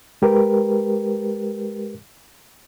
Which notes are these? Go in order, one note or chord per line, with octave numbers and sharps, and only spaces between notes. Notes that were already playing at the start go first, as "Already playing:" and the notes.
G#3 G4 A#4 B4